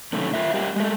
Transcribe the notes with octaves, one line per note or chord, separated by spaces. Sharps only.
F#2 C3 D#3 A3 C#4
F4 A#4 E5
G3 G4 A#4 D#5 G5
G#3 A3